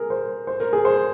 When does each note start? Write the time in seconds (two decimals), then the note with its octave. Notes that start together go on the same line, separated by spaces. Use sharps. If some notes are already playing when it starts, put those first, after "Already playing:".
Already playing: G#4 A#4
0.10 C5
0.47 C5
0.60 A#4
0.73 G#4
0.85 C5